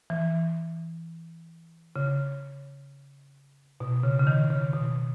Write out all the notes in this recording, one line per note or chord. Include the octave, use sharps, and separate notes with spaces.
E3
C#3
B2
C#3
C#3
D#3
C#3
B2